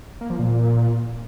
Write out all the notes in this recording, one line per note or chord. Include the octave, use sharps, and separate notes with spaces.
A#3
F3
A#2